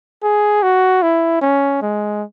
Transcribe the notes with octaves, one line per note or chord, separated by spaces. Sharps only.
G#4
F#4
E4
C#4
G#3